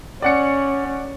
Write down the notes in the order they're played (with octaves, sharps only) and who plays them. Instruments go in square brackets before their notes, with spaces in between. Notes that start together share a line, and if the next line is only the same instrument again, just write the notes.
[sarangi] C#4 [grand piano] D5 F#5 C#7